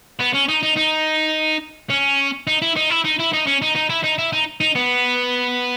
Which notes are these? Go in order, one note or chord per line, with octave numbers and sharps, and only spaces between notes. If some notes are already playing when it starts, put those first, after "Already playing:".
B3
C#4
D#4
D#4
D#4
C#4
D#4
E4
D#4
E4
D#4
E4
D#4
C#4
D#4
D#4
E4
D#4
E4
D#4
D#4
B3